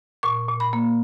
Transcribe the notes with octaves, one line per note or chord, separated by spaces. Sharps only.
A#2 C#6
A#2
B5
A#3